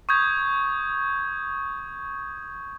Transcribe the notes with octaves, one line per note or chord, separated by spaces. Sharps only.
C#6 D#6 G6 G#6